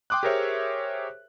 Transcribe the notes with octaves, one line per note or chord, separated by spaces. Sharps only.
G5 C6 D6 D#6 F#6
G4 G#4 A#4 C5 C#5 E5